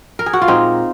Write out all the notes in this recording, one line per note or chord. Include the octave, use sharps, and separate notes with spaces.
A#4
G#4
F#4
F4
A#2 G#3 C4 D#4